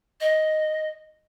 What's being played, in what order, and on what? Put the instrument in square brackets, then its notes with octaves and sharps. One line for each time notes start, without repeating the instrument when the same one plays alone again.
[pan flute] D#5